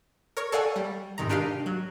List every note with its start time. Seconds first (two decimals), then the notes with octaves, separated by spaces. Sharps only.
0.37 A#4 C#5 C#6
0.52 A4 C#5 D5 F5 F#5 G#5
0.76 G3
1.18 G#2 C3 D#3 A#5
1.29 D4 D#4 G4 A#4 F5
1.66 F#3